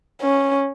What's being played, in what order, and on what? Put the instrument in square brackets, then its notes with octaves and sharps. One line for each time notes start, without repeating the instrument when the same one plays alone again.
[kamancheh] C#4